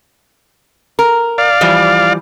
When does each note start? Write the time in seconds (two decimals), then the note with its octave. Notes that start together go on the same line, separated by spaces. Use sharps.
0.99 A#4
1.38 D5 F5
1.61 E3 F3 G3